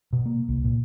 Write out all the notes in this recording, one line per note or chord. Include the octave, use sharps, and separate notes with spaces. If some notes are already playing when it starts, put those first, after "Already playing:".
B2
A#3
C2
A#2